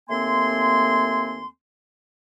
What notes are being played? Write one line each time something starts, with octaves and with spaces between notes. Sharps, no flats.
D#2 A3 A#3 C4 G#5 C6